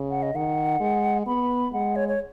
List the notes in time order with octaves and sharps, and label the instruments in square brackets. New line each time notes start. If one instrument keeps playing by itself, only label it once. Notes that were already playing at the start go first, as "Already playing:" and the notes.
Already playing: [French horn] C#3
[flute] F#5
D#5
[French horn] D#3 [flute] F#5
[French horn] G#3
[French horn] B3 [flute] B5
[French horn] G#3 [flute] F#5
[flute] C#5
C#5